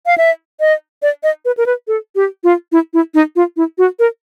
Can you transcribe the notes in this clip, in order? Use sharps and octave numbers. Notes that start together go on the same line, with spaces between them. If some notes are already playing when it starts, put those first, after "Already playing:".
F5
E5
D#5
D5
D#5
B4
A#4
B4
A4
G4
F4
E4
E4
D#4
F4
E4
F#4
A#4